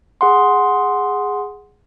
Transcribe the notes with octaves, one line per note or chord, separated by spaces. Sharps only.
G#4 F#5 C6